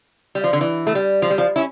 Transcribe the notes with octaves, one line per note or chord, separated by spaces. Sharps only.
G3
F3
D3
E3
A3
G3
F3
G3
F3
C#4 E4